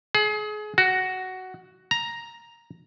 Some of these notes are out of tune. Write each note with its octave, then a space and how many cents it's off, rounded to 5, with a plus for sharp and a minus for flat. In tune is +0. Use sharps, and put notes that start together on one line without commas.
G#4 +30
F#4 +10
A#5 +5